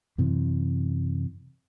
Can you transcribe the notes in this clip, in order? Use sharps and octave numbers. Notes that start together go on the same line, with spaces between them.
F#2 C3 E3